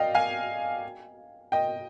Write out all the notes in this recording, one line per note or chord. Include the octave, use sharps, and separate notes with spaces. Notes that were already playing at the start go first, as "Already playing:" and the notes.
Already playing: D5 D#5 F5 G5
F5 G#5
D#5 G5